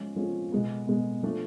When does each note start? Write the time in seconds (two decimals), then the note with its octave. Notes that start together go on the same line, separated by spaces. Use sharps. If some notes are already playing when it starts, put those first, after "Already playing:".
Already playing: F3 G#3 C#4 F4 G#4
0.16 F3 G#3 C#4 F4 G#4
0.52 B2 G#3 B3
0.87 B2 G#3 B3
1.23 F3 A3 D4